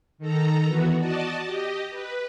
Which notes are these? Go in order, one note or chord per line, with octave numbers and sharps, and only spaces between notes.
D#3 A4 A#5
E3 B3 F#4
F#4 D5 D#5 A5
G4 D#5
B4